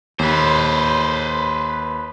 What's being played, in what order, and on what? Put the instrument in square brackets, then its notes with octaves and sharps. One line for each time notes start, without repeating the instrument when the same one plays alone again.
[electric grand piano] D#2 [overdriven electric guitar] B4 C5